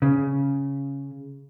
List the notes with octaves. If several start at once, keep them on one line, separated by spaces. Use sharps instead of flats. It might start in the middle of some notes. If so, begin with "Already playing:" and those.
C#3